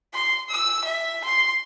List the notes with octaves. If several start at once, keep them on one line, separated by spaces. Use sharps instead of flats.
C6
E6
E5
C6